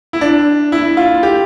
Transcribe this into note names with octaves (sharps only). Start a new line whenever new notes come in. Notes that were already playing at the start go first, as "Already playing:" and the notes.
E4
D4
E4
F4
G4